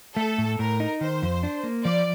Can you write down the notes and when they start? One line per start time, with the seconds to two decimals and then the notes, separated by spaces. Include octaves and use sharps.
0.16 A3 A4
0.38 A2
0.59 A2 A#4
0.80 D#4
1.01 D#3 C5
1.22 F2
1.43 D4
1.63 A#3
1.85 F3 D5